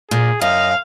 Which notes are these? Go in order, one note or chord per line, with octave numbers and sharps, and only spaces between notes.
A#2 G#4
F#2 D#5 F5